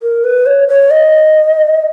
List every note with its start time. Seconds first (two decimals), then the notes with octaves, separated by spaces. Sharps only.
0.03 A#4
0.24 B4
0.46 C#5
0.68 C#5
0.91 D#5